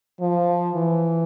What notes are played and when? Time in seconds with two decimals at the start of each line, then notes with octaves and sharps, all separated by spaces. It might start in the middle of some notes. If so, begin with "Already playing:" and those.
0.21 F3
0.75 E3